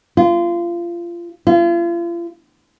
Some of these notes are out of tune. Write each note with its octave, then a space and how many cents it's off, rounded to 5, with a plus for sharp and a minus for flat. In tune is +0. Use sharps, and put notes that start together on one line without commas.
F4 -25
F4 -40